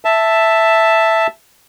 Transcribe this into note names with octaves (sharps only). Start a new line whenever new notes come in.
E5 A5